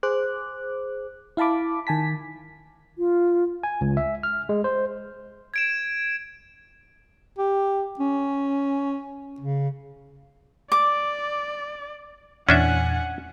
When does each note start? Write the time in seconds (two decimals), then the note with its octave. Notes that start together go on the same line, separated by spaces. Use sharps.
0.03 G#4 C5 D6 F#6
1.37 E4 F5 A5 B5 D6
1.87 D#3 G#5 A5 B6
2.98 F4
3.63 G#5
3.81 C#2
3.97 E5
4.23 F6
4.49 G#3
4.64 C5
5.54 G#6 D7 E7
7.38 G4
7.99 C#4
9.40 C#3
10.72 D5 D6
12.49 E2 A#2 E3 C#4 D4 E5 F#5 G#5